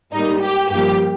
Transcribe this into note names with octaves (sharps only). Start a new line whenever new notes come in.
G#2 G3 A#3 D#4
G4
G2 F3 A#3 G4